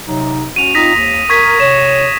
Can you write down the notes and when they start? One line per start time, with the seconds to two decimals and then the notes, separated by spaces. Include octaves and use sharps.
0.07 C3 F#3 D#4
0.56 C#4 F#4 D#7 F7
0.75 C4 D#4 F4 D#6 A#6 B6
0.95 D#2
1.30 A#4 C#6 G#6 B6
1.60 C3 C#5 E7